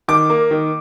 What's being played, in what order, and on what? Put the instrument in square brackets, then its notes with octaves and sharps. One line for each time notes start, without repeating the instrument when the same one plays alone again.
[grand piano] D#3 D6
A#3
D#3